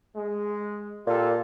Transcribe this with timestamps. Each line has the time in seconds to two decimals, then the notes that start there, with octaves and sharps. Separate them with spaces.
0.15 G#3
1.07 A#2 F4 G4 A4